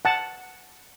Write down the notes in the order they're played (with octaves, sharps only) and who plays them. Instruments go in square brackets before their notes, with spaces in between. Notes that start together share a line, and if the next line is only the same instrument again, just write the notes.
[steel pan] F#5 A5